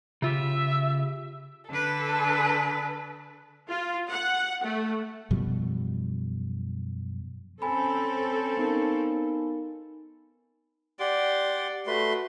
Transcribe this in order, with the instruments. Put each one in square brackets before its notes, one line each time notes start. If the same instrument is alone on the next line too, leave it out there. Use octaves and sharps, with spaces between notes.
[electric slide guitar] C#3 F4 G4 [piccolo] E5
[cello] D3 B4 [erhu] A4
[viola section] F4
F#5
A3
[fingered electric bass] F#2 B2 F3 G3
[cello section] C4 C#4 A4 [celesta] G#5 B5
[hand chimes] B3 D#4 A#4
[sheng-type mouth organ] G4 F#5 C6 [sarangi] D5
[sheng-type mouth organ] A3 B4 C6 [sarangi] F#4